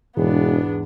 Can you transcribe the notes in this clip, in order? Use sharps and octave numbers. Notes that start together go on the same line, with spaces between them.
E1 E2 G#2 B3 D4